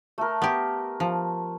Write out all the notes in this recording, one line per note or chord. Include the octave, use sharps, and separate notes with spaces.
A3 A#4
B3 G4
F3